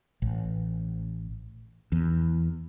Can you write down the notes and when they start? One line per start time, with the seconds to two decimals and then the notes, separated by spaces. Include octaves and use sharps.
0.22 A1
1.92 E2